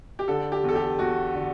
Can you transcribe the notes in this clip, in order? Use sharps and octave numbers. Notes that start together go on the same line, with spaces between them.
G4
D3 A4
G4
E2 A4
G4
E2 F#4
D3